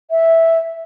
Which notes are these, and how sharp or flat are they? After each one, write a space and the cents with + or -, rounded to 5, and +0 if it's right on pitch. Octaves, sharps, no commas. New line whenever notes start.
E5 -5